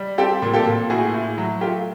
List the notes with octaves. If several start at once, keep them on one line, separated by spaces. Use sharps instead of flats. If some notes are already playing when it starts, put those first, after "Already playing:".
Already playing: G3
C4 G4 A4
A#2
G4 A4
A#2
A2 F#4 G#4
A2
F#3
A3 F4 G4